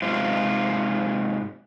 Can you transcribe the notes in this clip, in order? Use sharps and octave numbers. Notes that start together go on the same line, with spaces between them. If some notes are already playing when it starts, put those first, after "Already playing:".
G#2 C3 F4